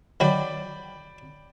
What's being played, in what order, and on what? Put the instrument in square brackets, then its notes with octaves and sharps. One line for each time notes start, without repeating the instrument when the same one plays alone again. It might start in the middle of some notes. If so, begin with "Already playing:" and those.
[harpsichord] D#3 F#3 F#4 [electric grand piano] D5 G5 B5